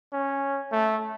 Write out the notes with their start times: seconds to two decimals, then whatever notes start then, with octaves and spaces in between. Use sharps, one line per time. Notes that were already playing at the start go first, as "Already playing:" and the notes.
0.13 C#4
0.72 A3